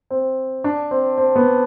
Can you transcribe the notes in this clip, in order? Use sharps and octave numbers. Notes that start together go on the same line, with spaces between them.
C4
D4
C4
C4
B3